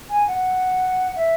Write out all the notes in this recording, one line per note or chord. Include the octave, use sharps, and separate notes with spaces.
G#5
F#5
E5